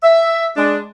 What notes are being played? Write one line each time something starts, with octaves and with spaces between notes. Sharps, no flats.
E5
G#3 D4